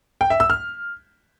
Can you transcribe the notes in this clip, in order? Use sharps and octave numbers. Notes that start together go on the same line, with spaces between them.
G5
E5
E6
F6